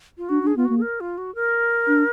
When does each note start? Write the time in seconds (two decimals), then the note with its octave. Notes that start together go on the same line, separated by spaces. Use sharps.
0.18 F4
0.29 D4 F#4
0.43 D4 G#4
0.56 B3 F4
0.65 A#3 F#4
0.78 G#4
0.82 A#4
1.00 F4
1.18 F#4
1.35 A#4
1.87 D4